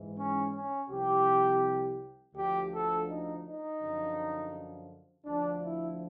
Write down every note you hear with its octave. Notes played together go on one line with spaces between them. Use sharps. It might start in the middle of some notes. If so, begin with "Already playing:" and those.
Already playing: G#2 E3
C#4
C#4
C2 C3 F3 G4
D2 D3 F3 G4
A4
D#4
D#4
F#2 D3 F3
D2 D3 F3 D4
E4